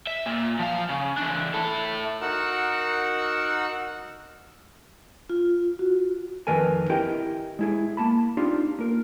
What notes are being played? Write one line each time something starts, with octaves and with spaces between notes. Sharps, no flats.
E5
A#2
F3 F5
C#3
E3 D4
E4 A4
D#4 F#4 A#4 F#5 E6 F#6
F4
F#4
F2 D#3 A#4 B4 G#5
C4 E4 G4 A#4 D#5 G5
G#3 E4 G#4
A#3 A5 B5
C4 D4 D#4 F4 G4
A#3 A#4